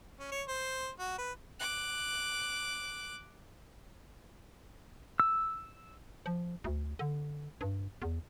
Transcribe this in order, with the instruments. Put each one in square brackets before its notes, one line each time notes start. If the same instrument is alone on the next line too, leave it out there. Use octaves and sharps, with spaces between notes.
[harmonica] C#4
C#5
C5
F#4
B4
[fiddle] D6 F#6
[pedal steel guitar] E6
[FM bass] F3
D2
D3
G2
E2